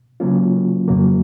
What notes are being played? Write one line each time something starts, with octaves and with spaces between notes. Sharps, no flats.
C#3 F#3 A#3 C#4 F4
F2 C#3 F#3 A#3